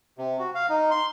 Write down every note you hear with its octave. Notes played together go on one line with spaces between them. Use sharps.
C3
F#4
F5
D#4
C6